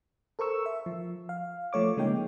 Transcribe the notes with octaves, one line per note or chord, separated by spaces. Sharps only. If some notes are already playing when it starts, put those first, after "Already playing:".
A4 A#4 C5 C#6 E6
E5
F3
F5
F3 A3 C#5 D6
C#3 G#3 A#3 D#4 G5